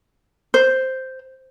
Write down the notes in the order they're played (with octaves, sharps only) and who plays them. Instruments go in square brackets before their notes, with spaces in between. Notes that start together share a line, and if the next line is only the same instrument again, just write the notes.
[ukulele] C5